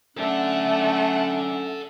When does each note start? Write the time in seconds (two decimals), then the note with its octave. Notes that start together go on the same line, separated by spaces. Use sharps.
0.17 D3 F#3 A3 C#4 A4 D5 F#5